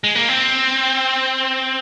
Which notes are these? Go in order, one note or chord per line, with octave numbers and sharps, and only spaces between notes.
G#3
A#3
C4